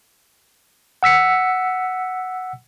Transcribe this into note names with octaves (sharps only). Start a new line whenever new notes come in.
F#5 E6 B6 C#7